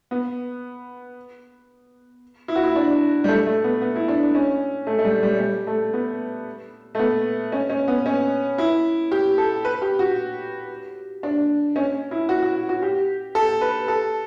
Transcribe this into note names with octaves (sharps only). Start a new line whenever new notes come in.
B3
E4
F#4
E4
D4
G3
A3
A3
B3
B3
E4
D4
C#4
A3
A3
G3
G3
G3
A3
B3
A3
B3
C#4
C#4
B3
C#4
E4
G4
A4
B4
G4
F#4
D4
C#4
E4
F#4
F#4
F#4
G4
A4
B4
A4